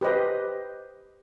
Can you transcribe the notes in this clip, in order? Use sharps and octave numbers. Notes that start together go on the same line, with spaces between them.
G4 B4 C5 D#5